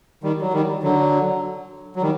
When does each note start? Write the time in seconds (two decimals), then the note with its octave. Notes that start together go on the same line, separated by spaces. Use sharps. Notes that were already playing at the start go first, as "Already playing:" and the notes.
0.23 D#3 G3
0.41 F#3
0.53 D#3 G3
0.83 D3 F#3
1.96 F#3
2.01 D#3 G3